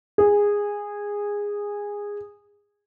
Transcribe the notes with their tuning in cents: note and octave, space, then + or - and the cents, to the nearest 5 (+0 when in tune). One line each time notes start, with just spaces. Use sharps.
G#4 -15